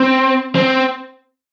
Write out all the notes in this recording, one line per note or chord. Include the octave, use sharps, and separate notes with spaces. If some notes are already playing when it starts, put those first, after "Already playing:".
Already playing: C4
C4